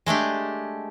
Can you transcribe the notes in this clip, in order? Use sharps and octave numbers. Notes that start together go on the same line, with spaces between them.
G#3 A3 D4 G4